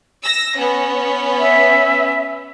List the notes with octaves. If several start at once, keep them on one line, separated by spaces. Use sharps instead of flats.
E6 A#6
B3 C#4
E5